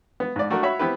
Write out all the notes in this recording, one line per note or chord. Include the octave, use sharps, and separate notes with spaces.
B3
G#2 D5
A3 D4 F#4 A#4
F#4 C#5 E5 B5
B3 C4 E4 G4 B4